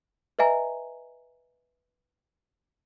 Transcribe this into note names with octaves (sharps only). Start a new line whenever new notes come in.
B4 D#5 E5 G#5 A#5